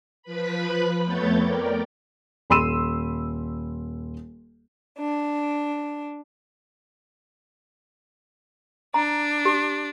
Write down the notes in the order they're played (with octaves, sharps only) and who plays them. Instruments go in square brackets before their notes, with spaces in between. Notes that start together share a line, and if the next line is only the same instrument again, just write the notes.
[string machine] F3 B4 B5
F2 A3 B3 C#5 G6 A6
A#4 D5 G5
[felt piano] D#1 B5 C6 E6 D#7 E7
[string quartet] D4
[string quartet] D4 [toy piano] A#5
[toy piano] G4